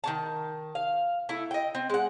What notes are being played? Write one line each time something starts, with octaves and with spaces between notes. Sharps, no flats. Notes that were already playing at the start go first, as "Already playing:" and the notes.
D#3 C#4 A5
F5
A3 E4
D#5 G5
C4
G#3 F#5